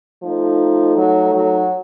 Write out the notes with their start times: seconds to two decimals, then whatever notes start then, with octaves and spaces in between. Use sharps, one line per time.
0.23 F3 A3 D#4 A4
0.97 F#3
1.35 F#3